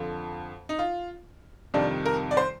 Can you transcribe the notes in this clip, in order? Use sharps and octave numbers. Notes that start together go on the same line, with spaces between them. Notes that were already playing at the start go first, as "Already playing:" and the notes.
Already playing: F2 D3 F3
D#4
F4
F2 C3 D#3 G3 D4
A#4
D5
C5